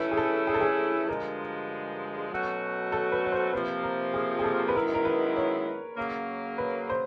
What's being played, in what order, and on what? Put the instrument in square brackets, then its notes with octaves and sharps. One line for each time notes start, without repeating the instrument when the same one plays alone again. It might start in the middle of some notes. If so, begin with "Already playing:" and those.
Already playing: [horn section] G2 E3 A3 C#4 E4 [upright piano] B4
[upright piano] G#4
A4
G#4
A4
G#4
[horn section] G2 D3 F3 G#3 [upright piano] A#4
[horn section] B2 F#3 A3 C#4 F#4
[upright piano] A4
B4
C#5
C5
[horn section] C3 F3 A#3 [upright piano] B4
[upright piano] A#4
G#4
G#4
A4
B4
[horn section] F#2 D#3 G#3 B3 E4 [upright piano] A#4
[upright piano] A#4
B4
C#5
[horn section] F#2 C#3 F#3 A#3
[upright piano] B4
C5